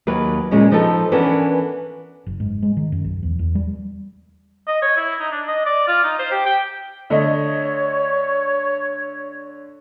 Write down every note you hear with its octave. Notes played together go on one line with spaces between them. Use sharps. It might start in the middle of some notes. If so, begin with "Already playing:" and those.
D#2 F#3 A#4 B4
A#2 C#3 G#3 C#4
F3 B3 D#4 A4
E3 B3 C#4 D4 A4 A#4
F#1
G#2
G#3
D#3
F#2
B1
E2
E2
G3
D#5
C#5
E4
D#4
D4
D#5
D5
F4
D#4
C5
G4
G5
D3 A3 C#5 D#5